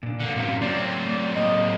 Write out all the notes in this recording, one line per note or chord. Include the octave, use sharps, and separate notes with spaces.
A#2 D4
D3 A#3
F#2 A2 C3 F5
F#3 A3 C4 D5
A2 A#3 D#5